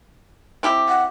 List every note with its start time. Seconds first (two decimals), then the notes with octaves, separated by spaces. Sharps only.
0.63 C4 E4 G4
0.89 F#5